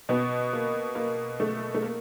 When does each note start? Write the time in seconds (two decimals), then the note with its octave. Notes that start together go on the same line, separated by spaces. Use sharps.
0.09 B2 B3
0.53 A#3
0.95 A#3
1.40 A3
1.74 A3
1.82 A#3